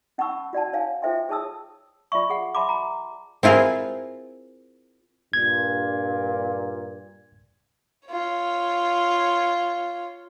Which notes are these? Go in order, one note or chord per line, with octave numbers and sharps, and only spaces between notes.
C#4 F#5 A5 B5 C#6 E6
F#4 D5 F#5 A5
C#5 F5 G#5
F4 A4 C5 E5 G5 C6
G#4 C#5 A5 D#6 E6
F4 D5 E5 C#6
G#4 F#5
E5 A5 B5 C6 D6
G#5 A#5
C4 E4 F4 G#4 A#4
G2 A#2 G#6
F4 C#5